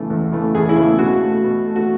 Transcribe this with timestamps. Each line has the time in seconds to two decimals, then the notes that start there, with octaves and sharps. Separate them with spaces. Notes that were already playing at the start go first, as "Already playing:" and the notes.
Already playing: E2 C#3 E3 A3
0.10 E2
0.32 C#3 E3 A3
0.54 E2 G#4
0.69 E4
0.77 C#3 E3 A3
0.98 B2 F#4
1.21 A3
1.43 B2
1.66 A3
1.76 F#4